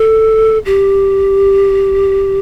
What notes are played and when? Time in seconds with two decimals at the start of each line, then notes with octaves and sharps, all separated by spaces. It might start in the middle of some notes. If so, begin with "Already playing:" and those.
Already playing: A4
0.66 G4